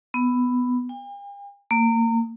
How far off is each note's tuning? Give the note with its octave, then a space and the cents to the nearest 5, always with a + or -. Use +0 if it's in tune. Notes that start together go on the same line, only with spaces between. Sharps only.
B3 +10
G5 +45
A#3 -30